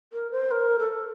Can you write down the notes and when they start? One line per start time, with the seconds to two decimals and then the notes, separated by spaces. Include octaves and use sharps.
0.13 A#4
0.32 C5
0.51 A#4
0.79 A4